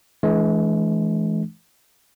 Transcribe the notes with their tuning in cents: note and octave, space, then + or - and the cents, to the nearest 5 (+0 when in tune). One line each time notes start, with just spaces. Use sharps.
E3 +0 G#3 +40 D4 -30